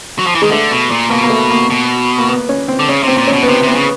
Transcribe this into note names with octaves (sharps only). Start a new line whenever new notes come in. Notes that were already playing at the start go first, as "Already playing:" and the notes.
F#3
F3
E3
D#3 G#3
D3 A3
B2
A#2
B2 A#3
A#3
A3
A#3
B2
A#3
B3
C#4
C4
D3
C#3 C#4
C3 C4
A#2
C#4
B2
B3
C3 C4
C3 B3
C#3